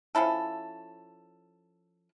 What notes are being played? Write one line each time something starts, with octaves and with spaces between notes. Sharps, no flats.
F3 C#4 E4 A4